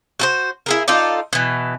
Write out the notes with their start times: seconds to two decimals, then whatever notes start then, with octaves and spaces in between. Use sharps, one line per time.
0.19 F#4 A4 C5
0.66 E4 G#4 A#4
0.88 D#4 F4 A4 D5
1.33 B2 E3